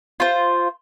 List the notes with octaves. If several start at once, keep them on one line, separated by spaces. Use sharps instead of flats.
F4 C5